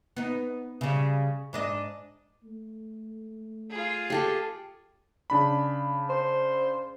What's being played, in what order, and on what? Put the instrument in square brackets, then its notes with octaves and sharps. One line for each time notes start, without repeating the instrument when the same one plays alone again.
[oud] B3 D#4
C#3 G3
G#2 D4 D#5
[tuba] A3
[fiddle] F4 G#4
[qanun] G4 A4 G5
[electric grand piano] C#3 D4 B5
[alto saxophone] C5